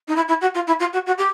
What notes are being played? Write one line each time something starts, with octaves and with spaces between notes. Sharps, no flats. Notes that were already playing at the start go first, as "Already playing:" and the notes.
D#4
E4
E4
F#4
F4
E4
F4
F#4
F#4
G4